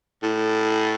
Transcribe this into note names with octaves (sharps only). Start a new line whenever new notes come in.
A2